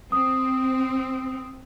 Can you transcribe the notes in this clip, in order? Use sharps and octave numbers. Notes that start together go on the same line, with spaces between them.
C4 D#6